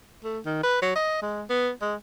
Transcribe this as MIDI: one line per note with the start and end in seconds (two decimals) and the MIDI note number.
0.24 0.39 57
0.45 0.58 51
0.63 0.80 71
0.82 0.95 54
0.96 1.19 75
1.22 1.43 56
1.50 1.70 59
1.82 1.95 56